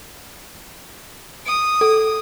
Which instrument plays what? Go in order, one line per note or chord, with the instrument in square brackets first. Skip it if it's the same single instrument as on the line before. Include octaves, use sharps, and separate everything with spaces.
[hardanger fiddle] D#6
[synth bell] A4